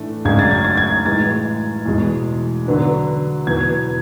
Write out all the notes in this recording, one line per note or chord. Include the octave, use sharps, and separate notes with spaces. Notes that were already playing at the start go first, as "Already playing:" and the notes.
Already playing: A2 E3 A3 D4
F#2 C#3 G#3 D4 G#6
A6
G#6
A6
G#6
A2 E3 G#3 A6
E2 B2 G#3
D3 F#3 B3 D4
E2 B2 F#3 B3 G#6